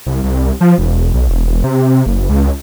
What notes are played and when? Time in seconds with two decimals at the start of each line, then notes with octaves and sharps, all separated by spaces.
0.06 C2
0.24 C2
0.61 F3
0.78 E1
1.14 B1
1.29 E1
1.45 E1
1.64 C3
2.06 F#1
2.30 C#2